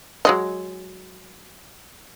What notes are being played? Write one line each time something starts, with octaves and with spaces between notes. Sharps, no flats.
F#3 G#3 D#5